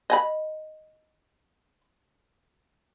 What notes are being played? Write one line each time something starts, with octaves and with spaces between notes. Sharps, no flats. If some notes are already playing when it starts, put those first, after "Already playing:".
D#5 G#5 B5